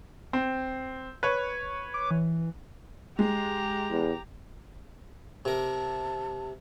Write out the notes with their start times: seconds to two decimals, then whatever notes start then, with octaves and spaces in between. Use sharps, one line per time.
0.33 C4
1.23 B4 C#5
1.94 D6
2.11 E3
3.19 G#3 G4 A#5
3.91 E2
5.45 C3 A#4 A5